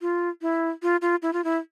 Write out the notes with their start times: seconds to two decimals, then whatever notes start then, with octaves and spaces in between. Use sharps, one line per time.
0.01 F4
0.42 E4
0.82 F4
1.02 F4
1.22 E4
1.33 F4
1.44 E4